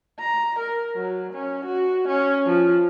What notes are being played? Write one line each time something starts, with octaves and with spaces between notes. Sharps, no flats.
A#5
A#4
F#3
C#4
F#4
C#4
F3